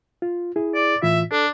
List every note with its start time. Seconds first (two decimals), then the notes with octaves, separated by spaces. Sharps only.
0.22 F4
0.56 E4 G#4
0.75 D5
1.03 A2 E3 F4 E5
1.32 D4 A4